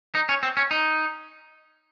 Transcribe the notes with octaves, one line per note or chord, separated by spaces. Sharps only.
D#4
C#4
C4
C#4
D#4